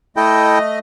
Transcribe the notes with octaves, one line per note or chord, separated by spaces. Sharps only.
A3 E4 A4 D#5 G5